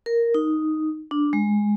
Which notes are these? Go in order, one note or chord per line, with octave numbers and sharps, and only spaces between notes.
A#4
D#4
D4
G#3